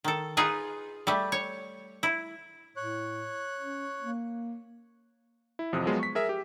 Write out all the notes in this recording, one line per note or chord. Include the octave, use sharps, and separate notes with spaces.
D#3 A4
D#4 F4 G#4 B4 D#5
G3 A3
C#5
E4
A2 C#5 F#6
C#4
A#3
E4
A1 F2 C3 D#6
F3 F#3 G#3 B3 F4
C#6 B6
G#4 A#4 E5
G4